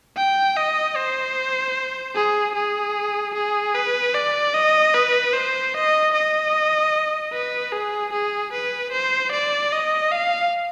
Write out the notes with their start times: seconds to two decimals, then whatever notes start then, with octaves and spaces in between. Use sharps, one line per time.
0.17 G5
0.57 D#5
0.96 C5
2.15 G#4
2.55 G#4
3.35 G#4
3.75 B4
4.14 D5
4.54 D#5
4.94 B4
5.34 C5
5.74 D#5
6.13 D#5
7.33 B4
7.72 G#4
8.13 G#4
8.53 B4
8.92 C5
9.32 D5
9.73 D#5
10.12 F5